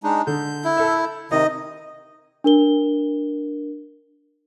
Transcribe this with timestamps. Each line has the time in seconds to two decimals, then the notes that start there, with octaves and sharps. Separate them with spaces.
0.04 G#3 D4 D#4
0.27 D3 G6
0.64 E4
0.77 A4 E5
1.31 C3 D#3 D#4 D#5
2.44 D4 A#4 G7